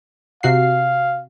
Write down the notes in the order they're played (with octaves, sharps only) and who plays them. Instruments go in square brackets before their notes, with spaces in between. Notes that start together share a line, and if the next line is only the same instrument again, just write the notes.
[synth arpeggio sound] C3 F#4 C7 [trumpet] F5